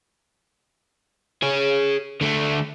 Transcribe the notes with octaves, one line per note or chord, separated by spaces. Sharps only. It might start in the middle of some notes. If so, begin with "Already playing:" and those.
G#4 C#5
D3 A3